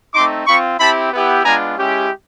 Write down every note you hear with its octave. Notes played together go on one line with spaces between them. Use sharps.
A3 C4 D#4 C6 D6
C4 F4 B5 C#6
C4 E4 G4 A5 B5
B3 E4 G4
G#3 B3 D4 F4 G#5 A#5
G#3 C#4 E4 G4